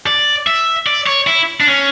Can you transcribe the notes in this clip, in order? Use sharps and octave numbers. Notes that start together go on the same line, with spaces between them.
D5
E5
D5
C#5
E4
D4
C#4